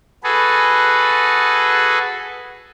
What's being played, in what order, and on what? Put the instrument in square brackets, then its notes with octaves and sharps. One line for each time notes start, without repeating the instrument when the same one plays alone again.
[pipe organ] F#4 G#4 A4 B4